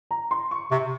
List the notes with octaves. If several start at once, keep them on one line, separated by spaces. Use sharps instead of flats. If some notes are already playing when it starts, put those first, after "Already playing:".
A#5
C6
C#6
C3 C#6